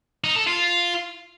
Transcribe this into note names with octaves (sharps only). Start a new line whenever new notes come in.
D#4
A4
F4